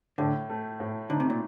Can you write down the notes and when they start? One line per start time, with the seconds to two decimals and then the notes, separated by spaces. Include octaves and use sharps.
0.18 A2 D3
0.49 A3
0.80 A2
1.10 D3 D#4
1.20 C3
1.30 A#2